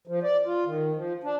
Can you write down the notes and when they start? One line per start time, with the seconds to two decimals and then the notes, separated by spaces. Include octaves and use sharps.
0.07 F3
0.23 D5
0.45 F4
0.66 D#3
0.95 F3
1.24 D4